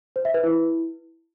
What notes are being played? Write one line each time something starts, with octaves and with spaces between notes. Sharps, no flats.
C5
E5
B4
E4